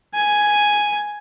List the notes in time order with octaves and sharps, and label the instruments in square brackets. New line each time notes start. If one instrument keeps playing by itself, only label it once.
[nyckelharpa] G#5